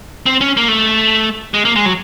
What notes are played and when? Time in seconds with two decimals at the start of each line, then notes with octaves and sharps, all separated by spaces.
0.26 C4
0.41 C#4
0.57 A#3
0.68 A3
1.54 G#3
1.65 A#3
1.76 G#3
1.86 F#3